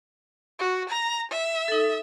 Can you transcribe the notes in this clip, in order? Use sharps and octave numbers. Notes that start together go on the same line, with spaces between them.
F#4
A#5
E5
D#4 A4